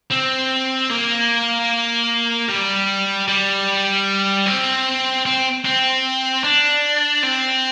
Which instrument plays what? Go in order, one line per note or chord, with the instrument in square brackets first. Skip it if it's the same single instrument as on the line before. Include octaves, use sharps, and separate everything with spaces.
[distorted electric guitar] C4
A#3
G3
G3
C4
C4
C4
D4
C4